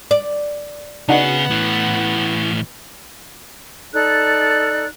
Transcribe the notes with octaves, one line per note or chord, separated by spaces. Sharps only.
D5
C#3 B3 D4 D#4 F#4 G#4 F#5
A2 E3
D#4 A4 D5 F#6